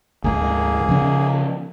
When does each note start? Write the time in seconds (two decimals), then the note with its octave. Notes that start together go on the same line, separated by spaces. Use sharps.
0.24 D2 G#2 A#3 G#4
0.89 C#3 F3 C#4